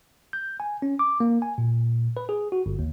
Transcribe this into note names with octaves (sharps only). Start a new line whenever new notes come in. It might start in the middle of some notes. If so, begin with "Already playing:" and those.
G6
G#5
C#4
D6
A#3
G#5
A#2
B4
G#4
F#4
G1
D#2